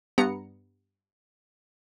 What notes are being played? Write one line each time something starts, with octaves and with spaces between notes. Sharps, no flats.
G2 B3 A#5 C#7